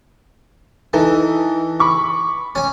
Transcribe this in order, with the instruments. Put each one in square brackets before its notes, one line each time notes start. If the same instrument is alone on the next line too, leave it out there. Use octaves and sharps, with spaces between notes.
[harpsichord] E3 [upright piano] D#4 E4 A4
[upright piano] B5 C#6 D6
[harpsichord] C#4 G#5